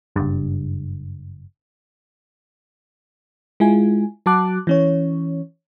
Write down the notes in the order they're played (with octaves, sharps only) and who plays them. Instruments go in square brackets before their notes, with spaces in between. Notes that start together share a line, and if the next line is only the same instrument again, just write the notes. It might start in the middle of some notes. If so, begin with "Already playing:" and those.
[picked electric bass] F#1 G2
[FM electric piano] G#3 E4 F4 G#5
F#3 F#4 A5 D6 F#6
E3 C#4 C#5